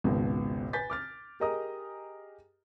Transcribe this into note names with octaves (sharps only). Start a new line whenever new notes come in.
G#1 C#2 B2
B4 G#5 G6 A6 B6
D6 F6 A6
G4 G#4 A#4 D#5 A#5 D#6